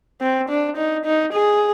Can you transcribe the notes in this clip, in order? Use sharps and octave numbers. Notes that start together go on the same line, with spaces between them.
C4
D4
D#4
D#4
G#4